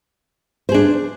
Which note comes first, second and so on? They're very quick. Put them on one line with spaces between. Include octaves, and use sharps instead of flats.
C5 G#4 D4